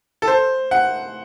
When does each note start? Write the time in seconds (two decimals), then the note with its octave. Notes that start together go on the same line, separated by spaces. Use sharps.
0.22 A4
0.28 C5
0.71 F#5